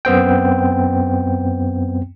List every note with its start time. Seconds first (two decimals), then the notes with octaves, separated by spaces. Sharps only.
0.05 F#2 B3 C4 G5